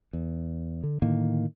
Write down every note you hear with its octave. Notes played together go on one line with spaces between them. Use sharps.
E2
D3
A2 D3 D#3 A#3